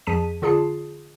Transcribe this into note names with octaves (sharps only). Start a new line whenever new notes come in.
F2 F3 G#4 A5 B6 D#7
D3 F4 G#4 D5 A5 C7